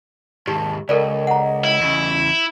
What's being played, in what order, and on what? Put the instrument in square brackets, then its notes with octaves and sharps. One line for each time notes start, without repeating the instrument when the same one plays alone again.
[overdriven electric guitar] D#2 G#2 [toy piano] G4 [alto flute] A5
[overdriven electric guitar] C#2 [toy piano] A4 A#4 D5 [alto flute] D#5
[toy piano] F#5 A#5
[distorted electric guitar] E4
[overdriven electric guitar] E2 C#3